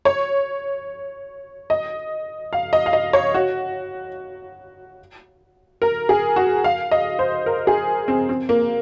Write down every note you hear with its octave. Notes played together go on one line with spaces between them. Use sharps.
C#5
D#5
F5
D#5
F5
D#5
C#5
F#4
A#4
G#4
F#4
F5
D#5
C5
A#4
G#4
C4
C4
A#3